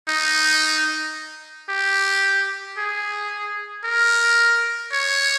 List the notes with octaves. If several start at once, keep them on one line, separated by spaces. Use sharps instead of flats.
D#4
G4
G#4
A#4
C#5